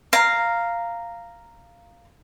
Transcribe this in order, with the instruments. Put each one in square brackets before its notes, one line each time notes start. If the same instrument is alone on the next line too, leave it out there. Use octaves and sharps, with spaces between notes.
[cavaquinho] F5 A#5